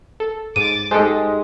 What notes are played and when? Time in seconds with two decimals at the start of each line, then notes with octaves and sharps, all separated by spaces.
0.20 A4
0.56 G#2 D6 A6 D#7
0.91 G#2 G#3 G4 A4 C5 D#5